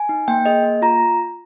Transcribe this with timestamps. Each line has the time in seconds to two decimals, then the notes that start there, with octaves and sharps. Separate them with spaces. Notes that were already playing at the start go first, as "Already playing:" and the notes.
Already playing: G#5
0.09 D#4
0.28 A#3 G5
0.46 G#4 D#5
0.63 A#3
0.82 F4 A#5